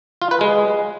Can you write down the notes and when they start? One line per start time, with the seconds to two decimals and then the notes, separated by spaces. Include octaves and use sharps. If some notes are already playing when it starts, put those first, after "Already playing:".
0.22 F4
0.31 B4
0.41 G#3